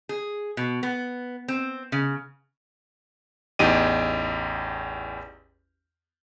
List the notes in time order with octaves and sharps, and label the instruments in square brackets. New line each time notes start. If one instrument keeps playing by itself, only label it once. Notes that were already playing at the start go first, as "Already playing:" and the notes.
[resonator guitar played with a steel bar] G#4
B2
B3
C4
C#3
[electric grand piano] A1 E2 D#4 G4 G5 D#7